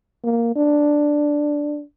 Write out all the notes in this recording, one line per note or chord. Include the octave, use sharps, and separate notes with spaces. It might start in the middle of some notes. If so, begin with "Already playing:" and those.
A#3
D4